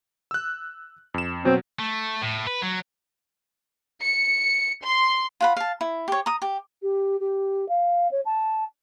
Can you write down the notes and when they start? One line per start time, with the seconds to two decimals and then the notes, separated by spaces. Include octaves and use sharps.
0.31 E6 F#6
1.14 F2 E7
1.45 B2 F#3 C4
1.79 A3
2.22 A2
2.47 B4
2.62 F#3
4.02 C#7
4.82 C6
5.41 F4 F#5 B5
5.56 F5 A5
5.81 E4
6.08 G4 C#5
6.26 A#5 D#6
6.42 G4
6.82 G4
7.20 G4
7.69 F5
8.11 C#5
8.25 A5